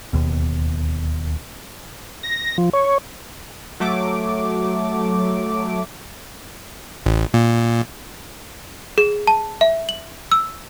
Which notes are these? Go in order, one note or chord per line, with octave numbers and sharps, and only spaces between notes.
D1 G1 D#2 B2
A#6
F3
C#5
F#3 A3 D6
A1
A#2
G#4
A5
E5
F#7
E6